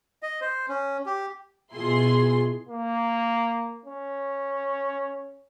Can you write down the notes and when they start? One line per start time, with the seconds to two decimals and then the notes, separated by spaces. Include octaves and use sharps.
0.23 D#5
0.41 C5
0.68 C#4
1.06 G4
1.75 B2 E4 F4 G#4 C6
2.68 A#3
3.86 C#4